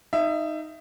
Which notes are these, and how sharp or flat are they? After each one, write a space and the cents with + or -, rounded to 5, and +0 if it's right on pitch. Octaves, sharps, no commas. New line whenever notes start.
D#4 +0 E5 +25